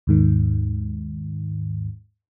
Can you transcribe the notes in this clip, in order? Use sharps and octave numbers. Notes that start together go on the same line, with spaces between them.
D#2 G#2 D#3